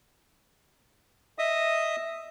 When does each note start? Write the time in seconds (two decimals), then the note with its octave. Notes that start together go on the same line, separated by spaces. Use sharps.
1.39 D#5 E5 D#6